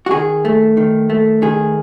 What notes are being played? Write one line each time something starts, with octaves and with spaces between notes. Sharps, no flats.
F#4
D#3 G#4
A3
D#3
A3
D#3 G#4